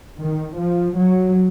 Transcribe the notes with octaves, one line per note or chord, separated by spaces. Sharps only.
D#3
F3
F#3